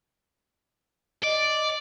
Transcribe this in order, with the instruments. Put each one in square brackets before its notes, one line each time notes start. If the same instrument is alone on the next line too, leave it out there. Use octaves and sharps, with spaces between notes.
[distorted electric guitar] D5 [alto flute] D#5